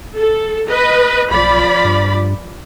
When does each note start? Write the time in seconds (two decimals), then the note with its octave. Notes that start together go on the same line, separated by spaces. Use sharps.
0.16 A4
0.68 B4 D#5
1.30 B1 F3 D5 B5
1.84 G2